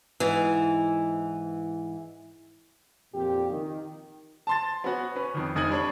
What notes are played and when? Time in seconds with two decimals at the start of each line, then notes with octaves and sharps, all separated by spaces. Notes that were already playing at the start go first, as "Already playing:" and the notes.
0.20 G#2 E3
3.14 F2 A#2 G4
3.50 D#3
4.47 A5 C6 A6
4.84 B3 C#4 F#4
5.15 C#4 B4
5.34 F2 D#3
5.55 F1 D#4 D#5 G#6 F#7
5.70 G3 D4 C#5